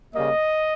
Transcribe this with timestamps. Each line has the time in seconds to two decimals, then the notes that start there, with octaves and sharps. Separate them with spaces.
0.14 C#3 G3 A#3 D#5